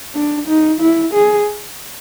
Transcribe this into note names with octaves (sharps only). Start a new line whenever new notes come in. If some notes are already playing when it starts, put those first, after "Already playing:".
D4
D#4
E4
G#4